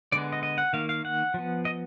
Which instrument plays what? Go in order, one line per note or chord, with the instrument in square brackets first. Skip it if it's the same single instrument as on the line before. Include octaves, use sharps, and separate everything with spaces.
[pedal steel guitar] D3 G#3 B3 D5
D#5
D#5
F#5
D#3 A#3 F5
F5
F#5
F3 B3
D#5